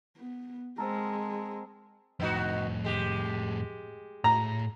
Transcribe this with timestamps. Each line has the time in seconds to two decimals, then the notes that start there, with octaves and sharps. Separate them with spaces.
0.17 B3
0.78 G#3 C4 A4 A#4
2.20 F2 A2 B3 D#4 F#4
2.84 G#3 G4
4.24 A2 A#5